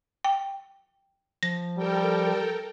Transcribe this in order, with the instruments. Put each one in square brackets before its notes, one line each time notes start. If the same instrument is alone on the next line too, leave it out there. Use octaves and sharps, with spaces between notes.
[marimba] G5
[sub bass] F3 [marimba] A#6
[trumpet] G3 [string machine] A4 A#4 G5